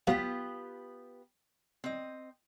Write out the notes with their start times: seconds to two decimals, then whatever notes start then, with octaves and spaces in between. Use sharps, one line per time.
0.07 F#3 B3 F4 G4 B4 F5
1.84 C4 D#5